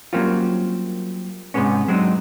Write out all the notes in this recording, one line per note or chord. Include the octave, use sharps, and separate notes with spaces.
F#3 G3 A#3 C4 C#4 F4
G#2 C3 G3 G#3 B3 C#4
F#3 G#3 C4 D4 D#4